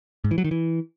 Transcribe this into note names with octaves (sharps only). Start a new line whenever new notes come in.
G#2
E3
F#3
D#3
E3